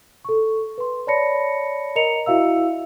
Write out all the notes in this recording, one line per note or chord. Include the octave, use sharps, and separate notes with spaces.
A4 C#6
B4 C6
C#5 D5 A5 B5 A#6 C#7
A#4 D#5 A#5 C#7 F7
E4 F#4 E5 F5 E6